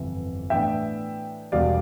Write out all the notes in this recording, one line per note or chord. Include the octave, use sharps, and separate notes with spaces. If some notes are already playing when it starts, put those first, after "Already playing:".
Already playing: G1 F2 C3 E3
A2 E3 B3 D4 E5 G5
E1 E2 B2 G3 D5 F5